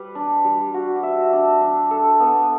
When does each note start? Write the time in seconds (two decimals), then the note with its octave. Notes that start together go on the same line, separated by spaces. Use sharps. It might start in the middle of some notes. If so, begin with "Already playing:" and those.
Already playing: G3 G4 B4
0.15 D4
0.45 G3
0.74 F#4
1.03 E5
1.33 D4
1.61 D4
1.91 A4
2.20 B3